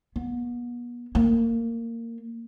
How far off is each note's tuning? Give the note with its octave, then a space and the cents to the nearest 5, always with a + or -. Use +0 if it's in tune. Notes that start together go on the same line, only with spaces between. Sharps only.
B3 -40
A#3 -20